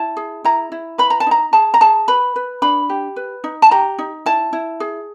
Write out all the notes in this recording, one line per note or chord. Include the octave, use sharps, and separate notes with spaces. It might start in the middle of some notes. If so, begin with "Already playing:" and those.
Already playing: E4 A5
G#4
E4 A#5
E4
B4 B5
A#5
A5
D#4 A#5
G#4 A5
A#5
G#4 A5
B4 B5
B4
D4 B5
G4
B4
D#4
A5
G4 A#5
D#4
E4 A5
E4
G#4